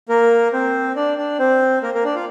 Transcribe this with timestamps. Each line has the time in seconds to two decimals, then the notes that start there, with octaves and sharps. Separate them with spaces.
0.09 A#3 A#4
0.53 C4 C5
0.96 D4 D5
1.18 D4 D5
1.39 C4 C5
1.83 A#3 A#4
1.94 A#3 A#4
2.05 D4 D5
2.15 F4 F5